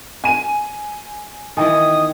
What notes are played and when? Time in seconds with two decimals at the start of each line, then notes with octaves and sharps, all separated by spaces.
0.24 G#5 D#7
1.57 D#3 E3 B3 D#5 G5 D#6